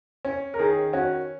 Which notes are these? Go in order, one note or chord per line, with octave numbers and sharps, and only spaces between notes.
C#4
A#4
D#3 G#4
C#4 F#4